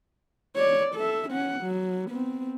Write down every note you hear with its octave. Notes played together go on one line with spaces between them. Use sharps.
C#5 D5
A4 E5
C#4 F#5
F#3
B3 C4